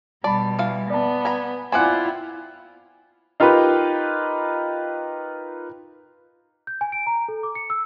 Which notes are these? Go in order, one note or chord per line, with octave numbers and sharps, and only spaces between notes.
B2 G3 D5 A5 B5
E3 F5
B3 D5 A5
G#5 A#5 B5
C4 E4 F4 D5 F#5 G#5 D6 F#6
D#4 F4 G4 A#4 B4
G6
G#5
D7
A#5
A4
D6
C#7
E6